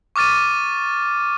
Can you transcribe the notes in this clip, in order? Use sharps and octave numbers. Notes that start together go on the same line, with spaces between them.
C#6 D6 F6 A6 D#7